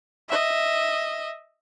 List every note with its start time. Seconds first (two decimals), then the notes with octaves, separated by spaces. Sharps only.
0.29 D#5 E5